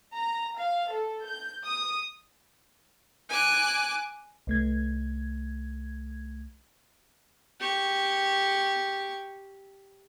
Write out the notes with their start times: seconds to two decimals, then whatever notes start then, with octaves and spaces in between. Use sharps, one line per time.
0.15 A#5
0.57 F5
0.89 A4
1.25 G6
1.65 D#6
3.29 G#5 D6 F#6
4.47 C2 A3 G#6
7.60 G4 C#6